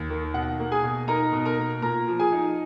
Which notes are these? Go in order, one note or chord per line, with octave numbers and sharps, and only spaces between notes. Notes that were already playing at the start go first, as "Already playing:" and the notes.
Already playing: D#2
D#3
B2 F#5
A#3
G#4 G#5
B2
D#4 A#4 A#5
B2
A#4 A#5
A#3
A#2 A#4 A#5
F3
G#4 G#5
D#4